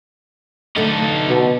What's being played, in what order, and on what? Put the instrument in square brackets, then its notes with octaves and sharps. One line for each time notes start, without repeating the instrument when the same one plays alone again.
[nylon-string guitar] D3 A3 [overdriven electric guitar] D#4 A4
[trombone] B2